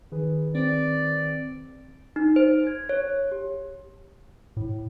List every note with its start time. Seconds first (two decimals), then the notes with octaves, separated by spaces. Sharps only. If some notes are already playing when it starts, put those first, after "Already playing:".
0.12 D#3 G#4 B4
0.55 C4 D5
2.16 D#4
2.36 C5
2.67 G#6
2.89 C#5
3.32 G4
4.57 A2